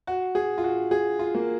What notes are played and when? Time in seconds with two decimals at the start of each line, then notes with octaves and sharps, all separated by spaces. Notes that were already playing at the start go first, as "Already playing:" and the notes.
0.07 F#4
0.35 G#4
0.58 F4
0.64 F#4
0.91 G#4
1.19 F4
1.35 A#3